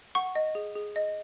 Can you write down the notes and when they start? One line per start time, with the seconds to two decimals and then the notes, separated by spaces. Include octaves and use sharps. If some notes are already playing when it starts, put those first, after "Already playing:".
0.15 F#5 C#6
0.35 D#5
0.55 G#4
0.75 G#4
0.96 D#5